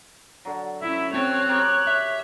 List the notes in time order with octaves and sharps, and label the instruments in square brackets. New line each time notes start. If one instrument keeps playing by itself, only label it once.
[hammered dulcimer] D3 F#3
[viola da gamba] C#4 E4 [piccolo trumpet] E5
[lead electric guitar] C4 [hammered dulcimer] A4 [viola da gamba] C#5 [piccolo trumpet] F#6
[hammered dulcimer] G4 A#4
[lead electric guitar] E5